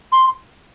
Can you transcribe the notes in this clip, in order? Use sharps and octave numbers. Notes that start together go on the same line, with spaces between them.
C6